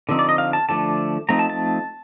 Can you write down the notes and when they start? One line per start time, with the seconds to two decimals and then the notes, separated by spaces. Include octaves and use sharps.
0.09 D3 F3 C4 D#4
0.19 D5
0.29 D#5
0.38 F5
0.53 A5
0.69 D3 F3 A3 D4 A5
1.29 F3 A3 C4 D#4 A#5
1.39 A5
1.50 A5